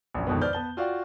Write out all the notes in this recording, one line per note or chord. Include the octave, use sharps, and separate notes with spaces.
A#1 F#2
F2 G#2 B2 D3 D#3 B3
B4 C5 D5 F6 G6
B3 A5 G7
F4 F#4 D5 F5 G5